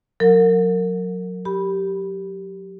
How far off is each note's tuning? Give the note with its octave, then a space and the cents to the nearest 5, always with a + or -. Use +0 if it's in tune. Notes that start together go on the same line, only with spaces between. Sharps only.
F#3 -25 A#4 -25 F#5 -45
G4 -10 B5 -5